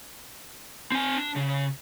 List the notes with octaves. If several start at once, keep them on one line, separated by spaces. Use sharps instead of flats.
C4 G#5
D4
C#3